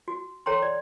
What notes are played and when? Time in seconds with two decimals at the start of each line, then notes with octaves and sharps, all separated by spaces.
0.08 F#4
0.46 A4 C#5 G5 A#5 C6
0.62 D5